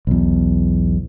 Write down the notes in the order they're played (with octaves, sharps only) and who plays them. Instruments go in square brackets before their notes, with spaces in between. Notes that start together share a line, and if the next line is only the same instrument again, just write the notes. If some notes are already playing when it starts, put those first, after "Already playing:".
[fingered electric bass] B1 E2